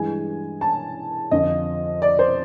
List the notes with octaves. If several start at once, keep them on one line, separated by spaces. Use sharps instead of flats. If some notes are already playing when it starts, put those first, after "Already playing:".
Already playing: G2 E3 G#3 G#5
A5
F2 D3 F3 D#5
D5
C5